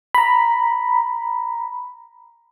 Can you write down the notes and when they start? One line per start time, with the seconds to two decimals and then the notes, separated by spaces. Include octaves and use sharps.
0.15 A#5 B5